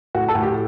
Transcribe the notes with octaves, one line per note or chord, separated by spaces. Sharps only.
A2 F#4
A4
A2
G4